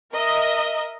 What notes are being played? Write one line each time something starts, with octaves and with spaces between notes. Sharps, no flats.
A#4 D#5 E5